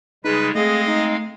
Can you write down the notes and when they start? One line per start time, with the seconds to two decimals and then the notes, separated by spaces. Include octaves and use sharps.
0.25 C#3 G3 G#3 D#4 G#4 B4
0.55 G#3 A3 C4 G#4 D#5 F5
0.87 D#4